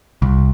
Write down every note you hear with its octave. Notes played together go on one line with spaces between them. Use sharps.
C2